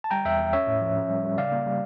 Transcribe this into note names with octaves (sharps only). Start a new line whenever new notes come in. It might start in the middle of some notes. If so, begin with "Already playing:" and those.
A5
G3 G5 A#5
E2 E5 G5
E2
C#4 C#5 E5
A2
F3
C#4
G3
G3
C#3 D5 F5
A#3
G3